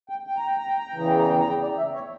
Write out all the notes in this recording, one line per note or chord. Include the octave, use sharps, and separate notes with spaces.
G5
G5
A#5
G5
A#5
G5
A#5
G5
E2 C#3 E3 A#5
G5
A#5
G5
A#5
G5
D5
E5
C#5